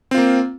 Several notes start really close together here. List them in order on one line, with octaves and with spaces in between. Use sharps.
C4 F4 A#3